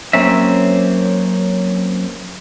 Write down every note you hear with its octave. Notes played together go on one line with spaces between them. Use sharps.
F#3 A#3 C4 C#4 E5